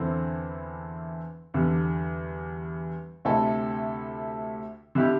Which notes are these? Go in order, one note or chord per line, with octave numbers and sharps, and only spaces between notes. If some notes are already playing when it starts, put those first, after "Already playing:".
Already playing: E2 D3 C4 E4 A4
E2 D3 G3
D2 C3 A3 E4 A4
D3 G3 E4 G4